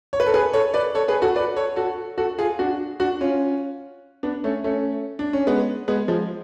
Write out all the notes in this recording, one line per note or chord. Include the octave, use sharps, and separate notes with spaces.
C#5
B4
A4
G#4 B4
A4 C#5
B4 D5
A4 C#5
G#4 B4
F#4 A4
B4 D5
A4 C#5
F#4 A4
F#4 A4
F4 G#4
D4 F#4
D4 F#4
C#4 F4
B3 D4
A3 C#4
A3 C#4
D4
C#4
G#3 B3
G#3 B3
F3 G#3